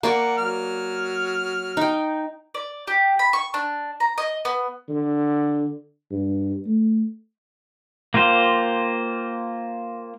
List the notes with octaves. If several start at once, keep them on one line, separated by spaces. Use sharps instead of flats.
A#3 D5 F#5 C#6
F#3 F6
D#4 G5
D5
G4
B5
C#6
D4
A#5
D#5
B3
D3
G2
A3
A#3 F4 G4 C5